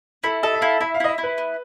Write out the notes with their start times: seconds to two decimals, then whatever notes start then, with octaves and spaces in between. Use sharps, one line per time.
0.23 E4 A4
0.43 A4 D#5
0.54 E5
0.61 E4 F5
0.81 E4 E5
0.94 F5
1.00 E4 D#5
1.08 E5
1.18 E4
1.23 B4
1.38 B3